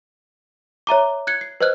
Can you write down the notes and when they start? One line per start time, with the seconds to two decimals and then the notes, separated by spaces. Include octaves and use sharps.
0.87 C#5 E5 A#5 D6
1.27 F#6 G#6 C#7
1.41 C7
1.61 B4 C5 D#5 F6 F#6